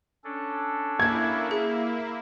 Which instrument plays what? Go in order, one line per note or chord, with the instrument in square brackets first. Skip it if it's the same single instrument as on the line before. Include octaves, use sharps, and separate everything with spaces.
[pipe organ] C#4 D4 A4
[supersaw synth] A#3 E4 [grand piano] G#6
[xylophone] G#4